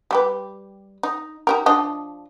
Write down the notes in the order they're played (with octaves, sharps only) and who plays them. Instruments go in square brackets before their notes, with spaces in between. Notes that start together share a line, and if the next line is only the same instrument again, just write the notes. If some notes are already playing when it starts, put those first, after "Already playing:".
[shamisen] G3 G4 B4
D#4
D#4 G4 A#4
F3 D4 D#5